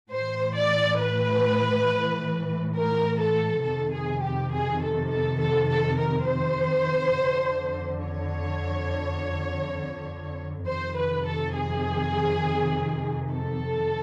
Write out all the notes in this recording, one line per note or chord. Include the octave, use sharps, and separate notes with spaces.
A2 E3 C5
D5
B4
A#4
A4
F2 C3 D#3 A4
G#4
G4
G#4
A4
A4
A4
A4
A#4
C5
F2 D3
C#5
F2 C3 D#3 C5
B4
A4
G#4
A4